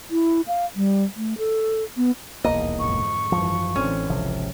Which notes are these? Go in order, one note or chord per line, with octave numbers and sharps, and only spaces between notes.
E4
F5
G3
A3
A4
B3
D#1 B1 E2 A#3 D#5
F2 G#2 D3 C#6
G#1 F#2 E3 F3
A1 D3 E3 C4 C#4
G#1 C#2 C3 F3